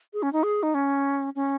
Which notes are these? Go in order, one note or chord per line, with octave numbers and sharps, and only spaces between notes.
G#4
C#4
D#4
G#4
D#4
C#4
C#4